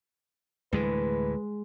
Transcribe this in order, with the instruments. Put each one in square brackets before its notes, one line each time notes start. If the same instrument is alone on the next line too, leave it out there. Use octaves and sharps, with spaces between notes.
[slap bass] D2 A2 E3 [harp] G#3 [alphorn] B4